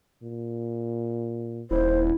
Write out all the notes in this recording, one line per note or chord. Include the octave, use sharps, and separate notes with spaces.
A#2
D#1 E4 C5